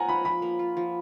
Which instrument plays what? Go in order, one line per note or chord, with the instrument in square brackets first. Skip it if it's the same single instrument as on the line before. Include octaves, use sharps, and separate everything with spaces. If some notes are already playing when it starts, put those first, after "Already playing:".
Already playing: [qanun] A#3 F4 [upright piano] F#5 G#5 A#5
[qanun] F3 [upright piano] B5
[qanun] F3 [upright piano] B5
[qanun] A#3
F4
F3